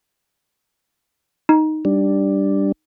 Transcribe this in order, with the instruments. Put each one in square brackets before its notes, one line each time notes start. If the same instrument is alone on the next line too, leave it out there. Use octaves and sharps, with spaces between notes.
[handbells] D#4
[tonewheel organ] G3 D4